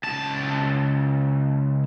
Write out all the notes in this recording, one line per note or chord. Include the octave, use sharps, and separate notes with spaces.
C#2 A5